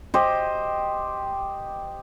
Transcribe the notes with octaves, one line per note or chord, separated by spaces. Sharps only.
G4 C5 D#5